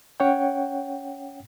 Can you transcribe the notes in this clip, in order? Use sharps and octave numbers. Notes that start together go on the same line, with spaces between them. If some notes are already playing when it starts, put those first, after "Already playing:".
C#4 C#5 F#5 G5